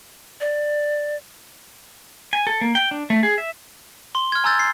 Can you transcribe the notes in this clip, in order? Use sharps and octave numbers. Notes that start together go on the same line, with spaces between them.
D5
G#5
A4
A#3
G5
D4
A3
G#4
E5
C6 G7
F6 G#6
G#5 A#5 C6 E6 G6 A6
C7